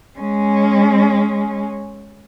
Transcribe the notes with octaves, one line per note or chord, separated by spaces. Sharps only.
G#3 C#4